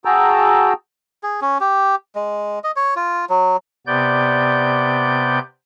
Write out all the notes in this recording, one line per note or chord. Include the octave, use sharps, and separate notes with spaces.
F#4 G#4 G5 A5 A#5 E6
G#4
C#4
G4
G#3
D#5
C#5
F4
F#3
C3 B3 D5 G6